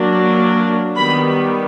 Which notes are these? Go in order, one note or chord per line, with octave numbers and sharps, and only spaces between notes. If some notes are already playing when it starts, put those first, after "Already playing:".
Already playing: F#3 A#3 D4
D#3 G3 B3 B5